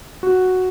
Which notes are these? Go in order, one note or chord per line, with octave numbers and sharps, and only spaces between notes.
F#4